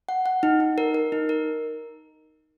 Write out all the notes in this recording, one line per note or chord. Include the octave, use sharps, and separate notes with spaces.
F#5
F#5
D#4
D#4
A#4
A#4
D#4
A#4